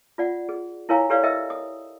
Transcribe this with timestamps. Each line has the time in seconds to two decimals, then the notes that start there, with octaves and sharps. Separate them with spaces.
0.18 F4 D5 F#5
0.49 G#4
0.89 E4 A#4 C#5 F5 G#5 A#5
1.10 G4 A4 B4 C#5 D5 F5
1.23 A#4 D#5 E5 G5 E6
1.50 D#6